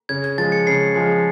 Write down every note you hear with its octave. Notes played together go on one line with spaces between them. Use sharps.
C#3 G#6
G#6
F3 G#3 A6
C#7
C#3 C7
F3 G#3